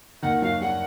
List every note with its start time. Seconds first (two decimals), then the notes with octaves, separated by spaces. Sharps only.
0.22 D#2 D#3 F#5
0.42 F#2 F#3 F5
0.61 G2 G3 F#5